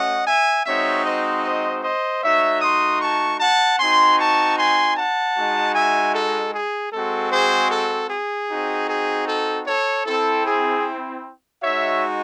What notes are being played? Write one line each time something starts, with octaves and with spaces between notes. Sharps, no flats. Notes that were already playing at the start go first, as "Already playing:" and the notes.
Already playing: A3 C#4 F#4 D#5 F#5
E5 G#5
G#3 C4 D#4 F#4 C#5 E5
C5 D#5
C5 D#5
C5 D#5
A3 D#4 F#4 C#5 E5
C6 D#6
A5 C#6
F#5 A5
C4 D#4 F#4 G#5 C6
A5 C#6
G#5 C6
F#5 A5
G#3 D#4 F#4
E5 G#5
A4
G#4
G#3 C4 F#4 A4
G#4 C5
A4
G#4
C4 D#4 F#4
G#4
A4
A4 C#5
C4 E4 A4
G#4
G#3 D#4 F#4 C#5 E5